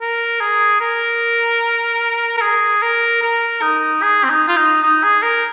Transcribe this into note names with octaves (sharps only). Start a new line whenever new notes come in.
A#4
G#4
A#4
A#4
G#4
A#4
A#4
D#4
G#4
C4
D#4
F4
D#4
D#4
G#4
A#4